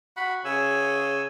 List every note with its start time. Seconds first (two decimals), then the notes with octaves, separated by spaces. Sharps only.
0.17 F#4 B5
0.45 C#3 G#5 E6